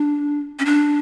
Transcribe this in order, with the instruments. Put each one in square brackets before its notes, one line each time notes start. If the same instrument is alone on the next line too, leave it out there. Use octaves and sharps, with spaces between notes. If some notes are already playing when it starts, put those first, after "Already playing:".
Already playing: [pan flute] D4
C#4
D4